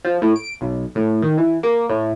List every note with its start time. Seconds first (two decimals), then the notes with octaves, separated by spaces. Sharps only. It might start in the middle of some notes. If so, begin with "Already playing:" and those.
0.05 F3
0.22 A2
0.36 D7
0.61 B1
0.95 A2
1.22 D#3
1.37 E3
1.63 A#3
1.89 A2